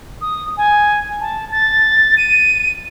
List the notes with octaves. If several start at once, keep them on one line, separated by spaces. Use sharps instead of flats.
D#6
G#5
A5
A6
D#7